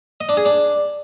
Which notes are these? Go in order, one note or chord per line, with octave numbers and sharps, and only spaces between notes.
D#5
D4
G#4
D4